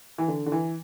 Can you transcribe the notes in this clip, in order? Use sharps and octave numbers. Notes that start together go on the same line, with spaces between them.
E3
D3
D3
E3